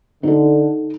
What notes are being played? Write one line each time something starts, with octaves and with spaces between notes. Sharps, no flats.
D3 D#4 A4